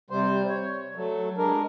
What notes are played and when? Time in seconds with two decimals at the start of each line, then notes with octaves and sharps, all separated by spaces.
0.10 C3 G3 C5
0.48 C#5
0.96 F#3 A3
1.38 G#3 D4 A#4